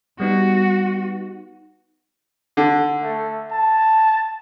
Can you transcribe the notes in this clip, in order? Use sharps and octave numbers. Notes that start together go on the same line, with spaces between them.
G3 B3 D#4 F#4
D3
A3
A5